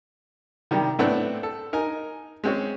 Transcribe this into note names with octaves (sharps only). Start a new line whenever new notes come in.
C3 D#3 G3
A2 A3 B3 C4 D4
A4
D#4 A#4 G#5
G#3 C4 C#4